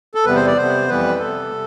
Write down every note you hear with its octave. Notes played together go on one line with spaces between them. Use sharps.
A4
E2 C3 G3 B3 B4
C5
D5
C3 G3 B3 C5
F2 E3 G3 B3 B4
C3 G3 B3 A4
C3